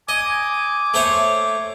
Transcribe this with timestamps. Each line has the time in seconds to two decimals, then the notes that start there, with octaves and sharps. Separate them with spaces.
0.09 D#5 G#5 D6
0.94 A3 C5 C#5